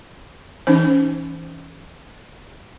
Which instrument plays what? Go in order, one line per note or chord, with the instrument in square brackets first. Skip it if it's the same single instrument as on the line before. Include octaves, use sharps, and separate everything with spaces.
[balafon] E3 C#4 D#4 C5